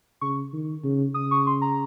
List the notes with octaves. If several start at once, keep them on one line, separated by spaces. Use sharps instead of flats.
C#3 C#6
D#3
C#3
C#3 D#6
C#6
C6
A#5